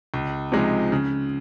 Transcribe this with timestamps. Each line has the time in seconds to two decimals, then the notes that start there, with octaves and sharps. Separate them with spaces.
0.14 C#2
0.52 C3 F3 G#3 D#4
0.92 C#3